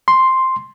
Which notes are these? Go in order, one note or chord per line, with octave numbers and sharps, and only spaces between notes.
C6